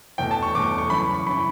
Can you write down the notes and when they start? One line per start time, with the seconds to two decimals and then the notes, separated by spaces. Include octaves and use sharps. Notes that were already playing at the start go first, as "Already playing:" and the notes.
0.18 E2 B2 A3 G5
0.31 A5
0.42 C#6
0.55 E2 B2 A3 D6
0.78 C#6
0.90 F#2 C#3 E3 B5
1.14 C#6
1.27 C#3 E3 B5